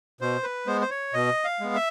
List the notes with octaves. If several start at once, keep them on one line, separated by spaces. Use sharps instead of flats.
B2 C5
B4
G#3 B3 C5
C5
C#5
B2 D#5
F5
G#3 B3
E5